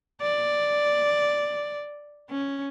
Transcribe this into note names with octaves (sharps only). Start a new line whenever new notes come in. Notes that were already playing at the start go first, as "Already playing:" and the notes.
D5
C#4